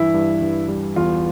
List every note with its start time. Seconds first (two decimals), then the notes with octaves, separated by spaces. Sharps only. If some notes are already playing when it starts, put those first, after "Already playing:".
Already playing: G2 E3 E4
0.14 G2
0.42 G2
0.68 G3
0.96 E2 F4